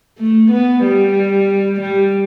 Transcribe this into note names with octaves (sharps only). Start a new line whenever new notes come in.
A3
B3
G3
G3